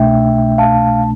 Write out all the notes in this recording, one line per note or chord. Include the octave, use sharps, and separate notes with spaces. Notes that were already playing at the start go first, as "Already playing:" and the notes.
Already playing: C2 B2 A3 D4 E5 G5
F5 A5